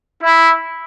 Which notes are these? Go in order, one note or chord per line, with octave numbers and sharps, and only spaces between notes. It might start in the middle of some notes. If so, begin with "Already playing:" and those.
E4